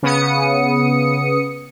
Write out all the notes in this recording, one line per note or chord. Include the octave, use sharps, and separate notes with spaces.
C#3 B3 D#6 C#7